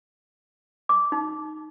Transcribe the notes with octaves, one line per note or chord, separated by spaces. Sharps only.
D6
D#4